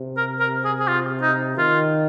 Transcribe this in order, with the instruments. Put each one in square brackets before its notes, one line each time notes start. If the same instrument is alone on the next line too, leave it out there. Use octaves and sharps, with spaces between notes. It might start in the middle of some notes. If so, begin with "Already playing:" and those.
Already playing: [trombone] C3
[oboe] A#4
A#4
G#4
G#4
F4
D#4
[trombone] D#3 [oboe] F4